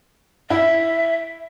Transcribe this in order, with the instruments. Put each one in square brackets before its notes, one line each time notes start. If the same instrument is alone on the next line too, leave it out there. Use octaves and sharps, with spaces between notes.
[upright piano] E4 [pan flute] E5